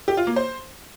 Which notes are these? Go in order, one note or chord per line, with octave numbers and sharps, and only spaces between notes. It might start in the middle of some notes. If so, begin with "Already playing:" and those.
G4
F4
A#3
C5